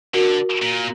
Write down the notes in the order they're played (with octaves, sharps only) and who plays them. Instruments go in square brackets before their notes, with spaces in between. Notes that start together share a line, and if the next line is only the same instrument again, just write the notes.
[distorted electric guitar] D3 [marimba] F#4 A#4
[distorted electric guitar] A#2